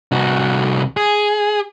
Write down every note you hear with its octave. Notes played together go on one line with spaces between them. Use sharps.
C2 F#4
G#4